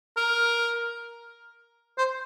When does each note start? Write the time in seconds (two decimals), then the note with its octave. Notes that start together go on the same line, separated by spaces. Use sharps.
0.17 A#4
1.98 C5